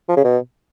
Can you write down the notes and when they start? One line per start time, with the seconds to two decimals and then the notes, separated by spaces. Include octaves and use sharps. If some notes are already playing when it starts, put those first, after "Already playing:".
0.09 F3
0.16 C#3
0.24 B2